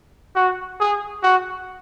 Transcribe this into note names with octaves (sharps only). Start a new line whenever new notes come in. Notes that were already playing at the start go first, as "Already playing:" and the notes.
F#4
G#4
F#4